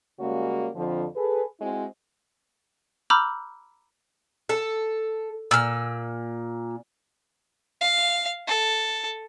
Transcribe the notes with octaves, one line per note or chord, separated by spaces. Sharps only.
C#3 G3 G#3 A#3 C#4 F#4
F2 D3 F3
G#4 A4 B4
G#3 C4 E4 F#4
A#5 B5 D6 E6 F6 G6
A4
A#2 E6 F6
F5
A4